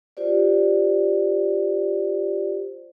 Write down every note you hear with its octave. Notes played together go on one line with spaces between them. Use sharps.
F4 G4 C5 D5